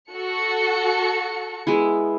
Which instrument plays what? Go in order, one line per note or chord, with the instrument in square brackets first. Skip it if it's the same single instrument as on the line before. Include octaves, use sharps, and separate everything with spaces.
[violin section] F#4 A4 C#7
[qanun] G#3 B3 E4